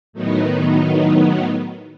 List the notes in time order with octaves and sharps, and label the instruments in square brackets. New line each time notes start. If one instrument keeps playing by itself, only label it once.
[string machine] A2 D#3 F#3 B3 D#4